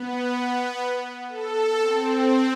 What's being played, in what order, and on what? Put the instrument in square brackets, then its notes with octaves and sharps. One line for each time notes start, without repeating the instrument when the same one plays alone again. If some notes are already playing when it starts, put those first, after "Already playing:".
Already playing: [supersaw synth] B3
A4
C4